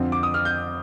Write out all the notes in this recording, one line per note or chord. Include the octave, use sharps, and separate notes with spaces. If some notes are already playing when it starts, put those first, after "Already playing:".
Already playing: F2 D3 F3 C4
D6
D#6
F6
G6